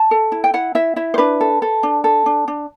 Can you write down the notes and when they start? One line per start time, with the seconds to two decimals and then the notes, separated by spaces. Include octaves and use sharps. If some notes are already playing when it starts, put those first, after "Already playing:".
Already playing: A5
0.11 A4
0.32 E4
0.44 G5
0.54 E4 F#5
0.75 E4 E5
0.96 E4 E5
1.14 C5
1.18 D4 B4
1.41 A4
1.62 A4
1.83 D4
2.04 A4
2.26 D4
2.48 D4